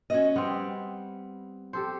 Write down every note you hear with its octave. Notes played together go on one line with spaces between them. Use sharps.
C#4 F#4 D#5
G3 B3 C4
G4 A4 C5